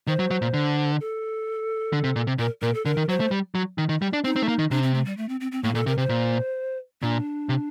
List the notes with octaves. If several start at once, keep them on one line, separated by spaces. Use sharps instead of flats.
D#3 C5
F#3
F#3
A#2
D3
A4
D3
C3
A#2
C3
A#2 A#4
A#2 A#4
A4
D3 A#4
D#3
F#3 C5
A3
G3
F#3
D#3
D#3
G3
D4
C4 D#4
C4
A3
A#3
D#3
C3 D4
C4
A3
G3
A3
C4
C4
C4
A2 A#3
A#2 A4
C3 A#4
C3 C5
A#2
A#2 D4
C3